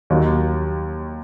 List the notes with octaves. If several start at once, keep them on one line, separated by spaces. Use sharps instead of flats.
D#2 D#3 F#3